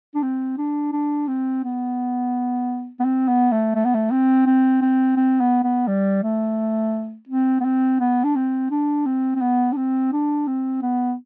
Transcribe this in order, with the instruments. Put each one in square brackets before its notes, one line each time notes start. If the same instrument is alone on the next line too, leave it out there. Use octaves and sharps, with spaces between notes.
[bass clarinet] D4
C4
D4
D4
C4
B3
B3
C4
B3
A3
A3
B3
A3
C4
C4
C4
C4
B3
B3
G3
A3
C4
B3
C4
B3
D4
C4
D4
C4
C4
B3
D4
C4
D4
C4
B3